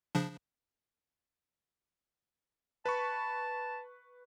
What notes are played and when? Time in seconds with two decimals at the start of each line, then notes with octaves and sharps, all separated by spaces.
0.15 C#3 F3 D4
2.86 B4 A5 B5 C#6